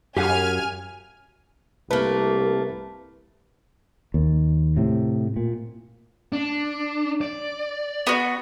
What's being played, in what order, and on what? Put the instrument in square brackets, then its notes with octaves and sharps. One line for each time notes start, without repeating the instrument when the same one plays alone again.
[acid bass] F#2 [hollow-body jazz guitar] G4 F5 F#5 [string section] G#5 F6
[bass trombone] C2 [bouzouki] A3 A#3 [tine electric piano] B4
[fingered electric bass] D#2
A2 C3
A#2
[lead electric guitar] D4
D5
[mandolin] B3 F#4